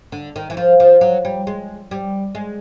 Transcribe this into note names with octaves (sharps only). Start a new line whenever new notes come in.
D3
D#3
E3
F3
F3
F#3
G3
G#3
G3
G#3